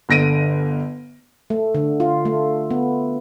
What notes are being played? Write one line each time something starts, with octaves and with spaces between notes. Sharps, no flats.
G1 D3 A#6 D7 D#7
A3
D3
F4
A3
B3